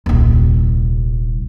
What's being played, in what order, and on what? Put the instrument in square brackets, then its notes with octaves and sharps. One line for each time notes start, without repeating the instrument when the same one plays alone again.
[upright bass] D#1 C2